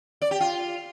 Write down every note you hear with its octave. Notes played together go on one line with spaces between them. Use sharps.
D5
G4
F4